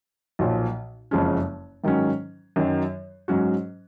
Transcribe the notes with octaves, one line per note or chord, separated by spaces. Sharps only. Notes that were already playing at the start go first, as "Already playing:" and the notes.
B1 A#2 F3
F#1 F2 F3 G#3 C#4
G#2 D#3 F#3 C#4
F#2 D#3 F#3
G#2 F#3 C#4 F#4